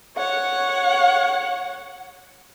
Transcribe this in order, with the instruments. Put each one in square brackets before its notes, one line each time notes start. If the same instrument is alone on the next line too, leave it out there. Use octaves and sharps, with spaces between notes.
[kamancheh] C#5 F#5